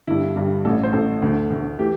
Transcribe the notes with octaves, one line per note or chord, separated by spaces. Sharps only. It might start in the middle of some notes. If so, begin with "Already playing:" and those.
G1 G2 G3 E4
G1 G2 G3
A1 A2 A3 A4
C5
A1 A2 A3 A4
D2 D3 A3
D2 D3 A3
E3 A3 G4